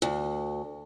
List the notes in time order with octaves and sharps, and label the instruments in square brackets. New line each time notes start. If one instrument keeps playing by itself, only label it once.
[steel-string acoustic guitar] D2